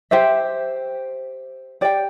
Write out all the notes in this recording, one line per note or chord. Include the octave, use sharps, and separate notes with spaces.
G4 C5 E5
G4 D5 G5